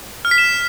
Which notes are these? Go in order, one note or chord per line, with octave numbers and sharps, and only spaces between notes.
F6
B6
E7